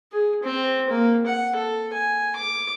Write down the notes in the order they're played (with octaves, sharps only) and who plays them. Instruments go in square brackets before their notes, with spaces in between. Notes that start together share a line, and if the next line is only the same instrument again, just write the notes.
[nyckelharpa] G#4
C4
A#3
F#5
A4
G#5
D6